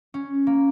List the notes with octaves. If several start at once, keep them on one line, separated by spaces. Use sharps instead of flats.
C#4
A#3